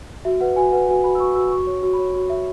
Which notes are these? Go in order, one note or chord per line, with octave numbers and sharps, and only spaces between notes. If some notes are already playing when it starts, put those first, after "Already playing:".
F#4 E5
B4 F#5
F#4 G#5
B4 F#5
F#4 G#5
F#4 B5
E6
F#4 C#6
F#4 E6
F#4 C#6
C#5
F#4
B5
C#5
F#4
F#4 E5